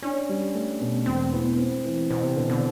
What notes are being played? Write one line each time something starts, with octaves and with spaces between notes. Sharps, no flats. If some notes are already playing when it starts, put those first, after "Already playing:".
C#4 D4
G3
A3
B2
E1 C4
E2 B3
C4
E3
B2 C4
C3
B2 D3
D3